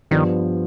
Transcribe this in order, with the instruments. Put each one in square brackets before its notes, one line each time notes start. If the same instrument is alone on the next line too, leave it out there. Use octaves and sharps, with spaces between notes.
[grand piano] G2 F3 B3 [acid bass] D#3